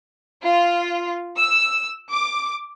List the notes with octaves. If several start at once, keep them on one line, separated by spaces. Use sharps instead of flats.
F4
E6
D6